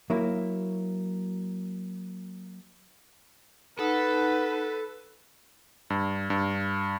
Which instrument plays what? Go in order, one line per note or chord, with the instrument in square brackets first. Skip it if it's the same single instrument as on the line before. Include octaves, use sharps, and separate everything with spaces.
[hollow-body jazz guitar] F#3 A#3 E4
[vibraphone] D#4 F#5 A5 [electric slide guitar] A4 [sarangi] B4
[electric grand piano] G2
G2